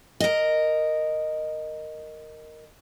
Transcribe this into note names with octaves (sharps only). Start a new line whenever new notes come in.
A#4 D#5